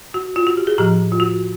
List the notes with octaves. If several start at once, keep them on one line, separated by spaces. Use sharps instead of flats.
F#4
F4
F#4
G4
G#4
A2 F3 G4
F4
F#4